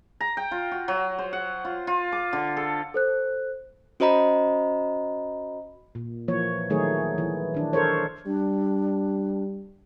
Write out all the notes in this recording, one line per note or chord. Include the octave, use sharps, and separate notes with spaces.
A#5
G5
F4
F#4
F#3
C5
F#5
F4
F4
D6
D3
A4
A4 C5 F#6
C#4 F#4 C5 D#5 A#5 B5
A#2
E3 F3 A#3 C#5
D#3 F#3 A3 D#4 G#4 C#5
E3
D#3 D4
A4 A#4 C5 C#5
G3 D4